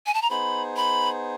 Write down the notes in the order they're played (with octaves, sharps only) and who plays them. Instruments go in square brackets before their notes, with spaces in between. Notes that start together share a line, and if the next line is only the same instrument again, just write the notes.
[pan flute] G#5
A5
A#5
[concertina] B3 D#4 G#4 C5 [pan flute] B5
[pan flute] B5